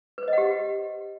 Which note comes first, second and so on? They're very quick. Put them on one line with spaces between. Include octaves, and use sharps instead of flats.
B4 C5 D#5 F#5 G4